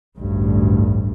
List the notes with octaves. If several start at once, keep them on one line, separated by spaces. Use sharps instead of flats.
A1 D2 G2